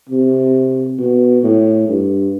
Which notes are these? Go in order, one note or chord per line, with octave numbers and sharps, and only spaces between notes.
C3
B2
A2
G2